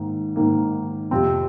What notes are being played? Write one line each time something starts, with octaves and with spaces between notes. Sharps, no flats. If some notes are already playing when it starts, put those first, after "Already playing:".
Already playing: G#2 D#3 A#3
G#2 D#3 A#3
F2 C3 F3 C4